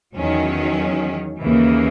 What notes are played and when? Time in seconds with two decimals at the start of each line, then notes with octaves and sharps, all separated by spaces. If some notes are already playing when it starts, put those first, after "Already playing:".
0.16 E2 D#3 F#3 C#4
1.40 D#2 C#3 E3 A#3